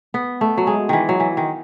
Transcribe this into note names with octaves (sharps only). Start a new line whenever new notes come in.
B3
A3
F#3
G#3
D#3 E3
F#3
E3
D#3